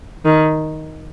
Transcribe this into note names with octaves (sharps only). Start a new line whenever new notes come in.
D#3